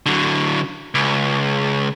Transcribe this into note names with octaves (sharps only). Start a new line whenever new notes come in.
D3 F#3
C#2